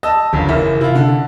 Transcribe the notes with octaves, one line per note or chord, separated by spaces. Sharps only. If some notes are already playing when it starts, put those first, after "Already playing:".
D#5 A5 E6
G1 F#2 C#3 D4
F#1 D#3 E3 E5
C3 E4 F4
D3